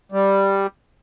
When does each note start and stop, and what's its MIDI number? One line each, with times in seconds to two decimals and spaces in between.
0.12 0.67 55